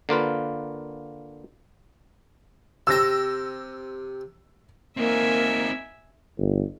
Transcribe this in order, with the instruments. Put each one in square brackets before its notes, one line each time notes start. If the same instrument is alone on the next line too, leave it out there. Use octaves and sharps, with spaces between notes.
[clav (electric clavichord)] D3 A#3 F4 B4
[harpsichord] C3 G5 [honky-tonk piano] E6 A#6
[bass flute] A#3 [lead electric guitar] C4 D#4 [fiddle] E5 G#5
[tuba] G1